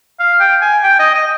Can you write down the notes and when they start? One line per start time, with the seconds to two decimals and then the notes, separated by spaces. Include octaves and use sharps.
0.19 F5
0.40 G5
0.61 G#5
0.83 G5
0.99 D#5
1.14 D#5